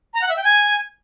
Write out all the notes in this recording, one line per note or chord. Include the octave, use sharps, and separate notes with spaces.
A#5
F#5
E5
G5
G#5